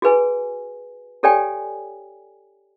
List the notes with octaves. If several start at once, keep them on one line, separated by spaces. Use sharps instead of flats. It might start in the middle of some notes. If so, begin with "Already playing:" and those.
F#4 G#4 B4 G#5
G4 A4 C#5 D5 G5 G#5